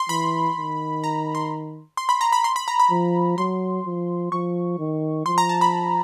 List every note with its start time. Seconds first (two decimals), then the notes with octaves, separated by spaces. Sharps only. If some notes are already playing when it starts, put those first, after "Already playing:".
Already playing: C6
0.09 E3 B5
0.57 D#3
1.04 A#5
1.35 C6
1.97 C6
2.09 B5
2.21 A#5
2.32 B5
2.44 C6
2.56 B5
2.68 A#5
2.80 B5
2.91 F3
3.38 F#3 C6
3.86 F3
4.32 F3 C#6
4.79 D#3
5.26 F3 C6
5.38 A#5
5.49 A5
5.61 B5